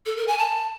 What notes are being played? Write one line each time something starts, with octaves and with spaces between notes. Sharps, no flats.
A4
A#4
G#5
A5